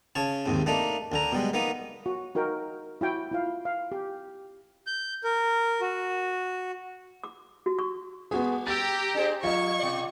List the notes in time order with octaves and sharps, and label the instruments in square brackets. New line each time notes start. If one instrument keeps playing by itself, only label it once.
[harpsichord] C#3 C#5 A5
D#2 G#2 C3
A3 A#3 D4 D#4
D2 D3 A#5
B2 G3 G#3
A#3 B3 D#4
[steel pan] F#4
D#4 F#4 A#4 G5
E4 F#4 G5
E4 F4 F5
F5
G4
[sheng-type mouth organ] G6
A#4
F#4
[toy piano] D6
F#4
C#6
[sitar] G3 [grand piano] B3 F#4 G#4
[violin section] G4 A#5 [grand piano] E6 A6
[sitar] D4 G#4 C5
[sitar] F3 [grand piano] F4 D#5 [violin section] C#6
[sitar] B2 D5